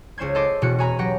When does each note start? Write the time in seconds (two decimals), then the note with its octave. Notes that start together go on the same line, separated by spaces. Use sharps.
0.18 C#2 C#4 C5 C6 G#6
0.35 A4 D#5 C6 D6
0.62 E1 B2 C#4 F#4 F#6 C#7
0.78 F#4 G#4 G#5 A#5 B5
0.99 F#3 G4 B4 F#5 A#6